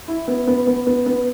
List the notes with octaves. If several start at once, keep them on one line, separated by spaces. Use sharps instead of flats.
E4
B3
B3
B3
B3
B3